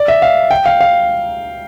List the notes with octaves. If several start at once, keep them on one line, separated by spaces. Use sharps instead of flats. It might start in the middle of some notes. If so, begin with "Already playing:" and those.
Already playing: D5
E5
F5
G5
F5
F5